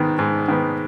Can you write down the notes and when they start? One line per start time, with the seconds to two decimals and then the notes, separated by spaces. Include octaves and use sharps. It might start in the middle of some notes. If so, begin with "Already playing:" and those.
Already playing: G#2 D#3 B3
0.19 G#2
0.48 D#3 B3